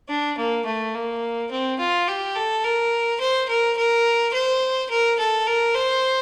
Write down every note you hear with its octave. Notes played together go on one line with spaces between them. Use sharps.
D4
A#3
A3
A#3
C4
F4
G4
A4
A#4
C5
A#4
A#4
C5
A#4
A4
A#4
C5